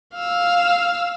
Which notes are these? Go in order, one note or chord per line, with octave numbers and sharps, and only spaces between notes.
F5 E6